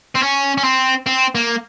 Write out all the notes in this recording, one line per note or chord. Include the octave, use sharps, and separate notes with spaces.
C4
C#4
C#4
C4
C4
A#3